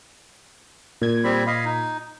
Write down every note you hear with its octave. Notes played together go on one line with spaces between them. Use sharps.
A#2 G#6
G3 C4 B5
D#5 F5 B5
D#4